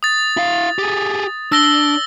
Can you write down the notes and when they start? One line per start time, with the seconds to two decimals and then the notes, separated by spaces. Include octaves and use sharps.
0.03 D#6 A6
0.37 E4 F5
0.78 G4 G#4
1.52 D4 E6 A#6 G7